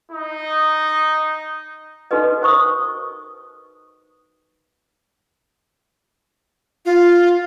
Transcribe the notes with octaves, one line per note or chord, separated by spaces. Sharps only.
D#4
D#4 F#4 A4 B4 D#5
A#4 C5 C#6 D#6
F4